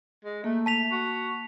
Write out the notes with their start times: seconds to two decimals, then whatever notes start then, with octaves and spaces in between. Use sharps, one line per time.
0.25 G#3
0.44 A3 A#3
0.66 A5 B6 F7
0.92 F#4